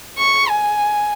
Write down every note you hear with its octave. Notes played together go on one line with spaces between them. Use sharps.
C#6
G#5